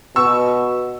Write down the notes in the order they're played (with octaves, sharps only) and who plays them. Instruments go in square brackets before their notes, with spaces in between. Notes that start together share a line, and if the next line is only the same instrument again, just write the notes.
[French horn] B2 [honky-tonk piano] C#6 E6